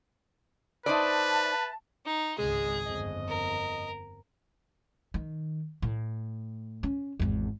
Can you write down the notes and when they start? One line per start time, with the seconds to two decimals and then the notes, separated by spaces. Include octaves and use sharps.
0.86 D#4 B4 C5 D5 E5 A5
2.05 D#4
2.38 G#1 C#2 G#3 G#4
2.86 G1 F2 D#5
3.28 A#4
5.14 D#3
5.82 A2
6.83 C#4
7.19 G#1 E2